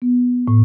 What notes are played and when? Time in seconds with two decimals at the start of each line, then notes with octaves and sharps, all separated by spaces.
0.02 B3
0.48 A2